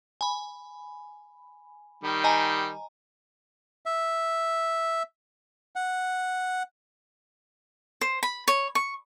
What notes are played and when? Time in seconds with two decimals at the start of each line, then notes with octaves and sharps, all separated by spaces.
0.21 G#5 B5
2.04 D#3 G3
2.24 D#5 G#5 A#5
3.85 E5
5.76 F#5
8.01 C5
8.23 B5
8.48 C#5
8.75 C#6